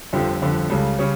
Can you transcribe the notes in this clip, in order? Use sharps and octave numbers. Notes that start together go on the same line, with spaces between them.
G1 F2 D3 F3 G4
G1 F2 D3 F3
C#2 C#3 G3 A4
C#3 G3 C#5